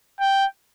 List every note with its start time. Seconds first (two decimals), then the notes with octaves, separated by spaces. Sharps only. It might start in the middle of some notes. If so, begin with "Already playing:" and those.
0.20 G5